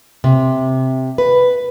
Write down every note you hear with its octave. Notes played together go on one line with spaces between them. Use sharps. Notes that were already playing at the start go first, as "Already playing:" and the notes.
C3
B4